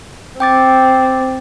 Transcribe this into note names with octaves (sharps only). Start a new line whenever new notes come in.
C4 G5 D6 A6